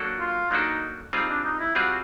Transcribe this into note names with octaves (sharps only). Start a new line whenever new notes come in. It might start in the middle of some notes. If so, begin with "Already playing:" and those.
Already playing: F#3 A#3 D4 F#4 A4
F4
F#3 A#3 D4 D#4 F#4 A4
G3 C4 D#4 F4 G#4
D4
D#4
E4
G3 C4 F4 F#4 G#4